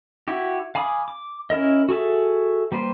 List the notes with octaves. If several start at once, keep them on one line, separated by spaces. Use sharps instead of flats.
E4 F#4 G4
F5 G#5 B5 D6 D#6
D6
C#4 E4 A#4 D#5
F#4 G#4 A4 E5
G3 A#3 B4 C5